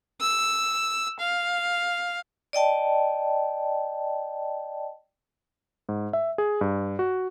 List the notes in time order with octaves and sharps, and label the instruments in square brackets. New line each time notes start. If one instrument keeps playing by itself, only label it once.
[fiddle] E6
F5
[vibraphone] D5 D#5 G5 A5
[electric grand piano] G#2
E5
G#4
G2
F#4